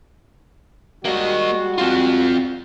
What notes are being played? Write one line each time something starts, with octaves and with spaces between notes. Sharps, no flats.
G3 G#3 A#3 F#4 D#5
C4 F4